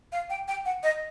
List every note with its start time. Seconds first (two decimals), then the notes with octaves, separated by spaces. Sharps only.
0.12 F5
0.30 G5
0.48 G5
0.65 F#5
0.83 D#5